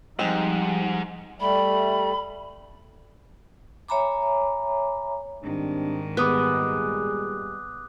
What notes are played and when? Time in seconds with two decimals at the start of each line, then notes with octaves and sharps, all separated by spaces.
0.19 G#2 F3 G3 G#3 C4 D#4
1.40 G3 A3 B5
3.89 C#5 E5 G#5 A#5 B5 D6
5.43 G#2 D#3 G3 C4 D4
6.17 A#2 G3 G#3 B3 D6 D#6 F#6